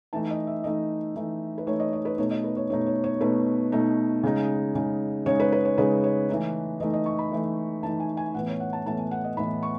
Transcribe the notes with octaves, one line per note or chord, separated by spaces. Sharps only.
E3 A3 D#4 A5
D#5
E5
E3 A3 D#4 D#5
E3 A3 D#4
B4
E3 A3 D#4 C#5
D#5
D#5
B4
B2 A3 D#4 C#5
D#5
B4
C#5
B2 A3 D#4 C#5
C#5
C#5
B2 A3 D#4 B4
B2 A3 D#4
C#3 G#3 D#4
C#3 G#3 D#4
C#3 G#3 D#4 C#5
B4
B4
C#5
C#3 G#3 D#4 B4
C#5
E3 A3 D#4
E3 A3 D#4 D#5
D#5
C#6
B5
E3 A3 D#4
E3 A3 D#4 A5
G#5
G#5
A2 E3 B3 F#5
C#5
F#5
A5
A2 E3 B3 A5
G#5
F#5
D#5
A2 E3 B3 B5
C#6